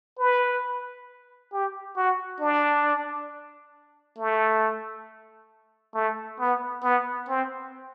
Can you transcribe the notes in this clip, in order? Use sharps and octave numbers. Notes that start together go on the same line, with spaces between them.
B4
G4
F#4
D4
A3
A3
B3
B3
C4